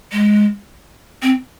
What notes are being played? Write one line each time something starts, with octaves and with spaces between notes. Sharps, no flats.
G#3
C4